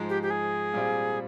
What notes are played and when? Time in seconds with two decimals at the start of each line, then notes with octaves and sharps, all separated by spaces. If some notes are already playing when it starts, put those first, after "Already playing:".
Already playing: G#2 F3 G#3
0.09 G4
0.23 G4
0.30 G#4
0.73 A#2 G3 C4 F4